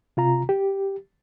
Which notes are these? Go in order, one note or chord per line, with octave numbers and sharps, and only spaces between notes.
C3 F4 A#5
G4